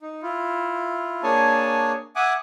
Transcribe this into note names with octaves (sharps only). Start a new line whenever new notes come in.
D#4
E4 F4
A#3 D4 G#4 C#5 G#5 A5
E5 F#5 G#5 D6 D#6 F#6